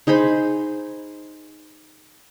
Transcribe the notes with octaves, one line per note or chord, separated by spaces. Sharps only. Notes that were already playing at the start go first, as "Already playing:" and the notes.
D#4 G#4 C5 B5